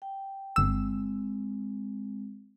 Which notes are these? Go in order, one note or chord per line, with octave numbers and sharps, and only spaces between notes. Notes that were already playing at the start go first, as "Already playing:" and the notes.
G5
G1 G#3 C4 E6